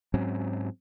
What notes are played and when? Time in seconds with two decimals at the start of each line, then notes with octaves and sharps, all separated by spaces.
0.14 G#2 F#3 C4 C#4